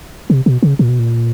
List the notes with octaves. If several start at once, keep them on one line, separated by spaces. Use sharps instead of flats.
C3
B2
C#3
A#2
B2
A#2